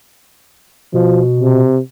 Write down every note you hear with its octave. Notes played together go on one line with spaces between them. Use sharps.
B2 F3
C3